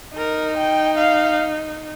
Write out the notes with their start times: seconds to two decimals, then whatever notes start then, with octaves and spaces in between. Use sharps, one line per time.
0.17 D#4 A#4
0.58 G5
0.98 F5